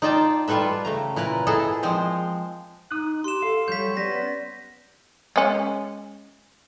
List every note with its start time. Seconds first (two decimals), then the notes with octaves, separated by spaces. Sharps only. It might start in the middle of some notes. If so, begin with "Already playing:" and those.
0.02 D#4 F4 D5 G5 A5
0.48 G3 F4 A4 B4 E5
0.85 C#3 A3 A#5
1.16 A#2 E4 A#4 B4 A#5
1.47 A#2 B3 E4 G#4 A4 D#5
1.83 F3 G#3 C4 C5
2.91 D#4 D#6 F#6
3.24 G4 C6 E7
3.42 A4 F5
3.68 F#3 G3 C#5 G6 B6
3.97 B3 C#4 B4 D5 A#6
5.36 G#3 C#4